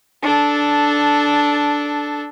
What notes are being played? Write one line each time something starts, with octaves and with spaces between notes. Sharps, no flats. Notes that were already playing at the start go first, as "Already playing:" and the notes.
D4 A4